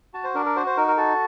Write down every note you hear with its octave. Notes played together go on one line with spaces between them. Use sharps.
F#4 A5
C5
D4 A#4
A#4
F#4 C5
C5
D#4 A#4
A#4
F#4 A4